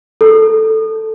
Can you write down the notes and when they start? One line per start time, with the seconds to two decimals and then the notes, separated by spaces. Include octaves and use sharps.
0.21 A4